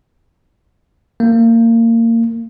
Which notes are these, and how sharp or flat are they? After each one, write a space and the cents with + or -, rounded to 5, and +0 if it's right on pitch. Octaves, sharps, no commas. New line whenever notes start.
A#3 -25